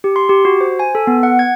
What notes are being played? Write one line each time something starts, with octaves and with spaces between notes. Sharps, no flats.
G4
C6
G4
F#4
C5
G#5
A4
B3
F#5
G#6